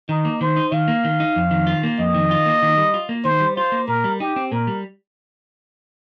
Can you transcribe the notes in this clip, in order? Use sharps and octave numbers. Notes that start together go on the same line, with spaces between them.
D#3 D#4
A#3
D#3 C5
D#4
D#3 F5
A#3
D#3
D#4
F2
D#3
F4
A#3
F2 D#5
D#3
F4
A#3
D#3
G3
F4
A#3
D#3 C5
G3
F4 C5
A#3
A#2 A#4
G3
D#4 G4
C4
A#2 A#4
G3